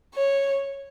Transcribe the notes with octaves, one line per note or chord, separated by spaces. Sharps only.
C#5